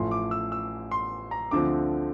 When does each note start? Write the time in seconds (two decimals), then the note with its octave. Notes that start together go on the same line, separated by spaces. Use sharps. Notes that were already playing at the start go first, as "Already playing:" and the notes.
Already playing: A1 A2 F3 C6
0.11 D6
0.31 E6
0.52 E6
0.91 C6
1.31 A#5
1.51 D2 D3 F3 C4 D6